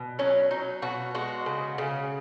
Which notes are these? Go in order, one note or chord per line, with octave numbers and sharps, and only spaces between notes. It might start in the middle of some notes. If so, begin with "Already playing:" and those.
Already playing: B2
F#3 C#4
F#3 D#4
B2 F#4
G#3 F#4
C#3
C#3